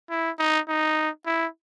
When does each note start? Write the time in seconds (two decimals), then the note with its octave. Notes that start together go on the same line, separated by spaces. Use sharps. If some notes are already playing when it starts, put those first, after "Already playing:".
0.10 E4
0.39 D#4
0.68 D#4
1.26 E4